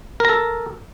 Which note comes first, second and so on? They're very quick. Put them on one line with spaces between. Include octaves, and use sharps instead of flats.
A#4 A#5 A4